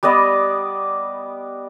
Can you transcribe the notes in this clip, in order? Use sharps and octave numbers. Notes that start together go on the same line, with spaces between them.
G3 B3 D5 D#5